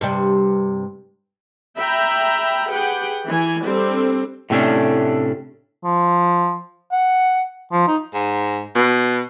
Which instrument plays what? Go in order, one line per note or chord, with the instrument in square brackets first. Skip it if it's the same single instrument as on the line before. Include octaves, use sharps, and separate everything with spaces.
[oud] G2 C3 G3
[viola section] E5 G5 A#5 B5
G4 G#4 B4 F#5 G5
E3 G#5
G3 C4 D4 A4
[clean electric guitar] A2 C3 A3 C#4 D4
[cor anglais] F3
F#5
F3
D#4
[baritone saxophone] G#2
B2